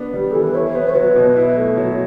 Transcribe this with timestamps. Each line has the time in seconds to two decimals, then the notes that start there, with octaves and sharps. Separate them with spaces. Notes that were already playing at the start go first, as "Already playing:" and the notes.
Already playing: B3 D4
0.13 G3
0.19 G4
0.31 E3 A4
0.43 B4
0.55 E4 C#5
0.70 C#5
0.75 B3 B4
0.89 C#5
0.95 F#3 B4
1.16 B2
1.36 E4
1.56 A3
1.77 F#3 C#5